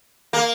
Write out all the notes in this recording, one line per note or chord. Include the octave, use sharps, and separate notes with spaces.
A#3